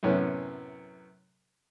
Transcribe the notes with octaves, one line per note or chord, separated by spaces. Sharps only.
F#2 A2 C3 B3 C#4